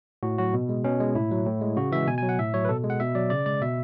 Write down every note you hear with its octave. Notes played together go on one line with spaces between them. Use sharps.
A2 F#4
F#3 F#4
B2
G#3
B2 C#4
G#3
A2 E4
F#3
A2
G#3
C#3 F#4
E3 G#3 E5
B2 G#5
G#5
F#3
F#5
A2 E5
F#3 C#5
B4
B2 A4
G#3
F#5
B2 E5
F#3 D5
C#3 D5
G#3 D5
B2 E5